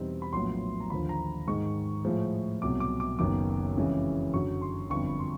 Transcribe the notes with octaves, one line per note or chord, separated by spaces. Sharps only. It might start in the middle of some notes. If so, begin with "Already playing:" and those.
Already playing: E2 B2 G3 C4 D#4
B5
A#1 A2 F#3 B3 C6
A#5
D#2 D3 F3 B5
A#5
G#2 D#3 G#3 C#6
A2 F3 G#3
C2 B2 F#3 D6
D6
D6
F#1 F#2 D#3 F#3 B3 D6
F2 C#3 E3 G#3 C#4
F#2 D3 F#3 C#6
C6
G1 F2 D3 C#6
B5
C6